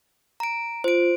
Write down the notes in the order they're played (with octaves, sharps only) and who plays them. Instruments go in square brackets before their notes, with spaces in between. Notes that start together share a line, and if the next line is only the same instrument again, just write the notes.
[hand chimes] A#5 D7
[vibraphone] F4 [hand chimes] C5 D7